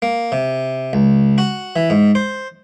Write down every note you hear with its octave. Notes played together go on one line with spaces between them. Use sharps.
A#3
C3
C#2
F#4
E3
G#2
C5